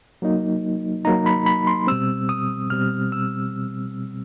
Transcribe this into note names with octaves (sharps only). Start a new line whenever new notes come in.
F#3 A#3 D#4
F#3 A#3 D#4 A#5
B5
B5
C6
B2 G3 C4 E6
D#6
B2 G3 C4 F6
E6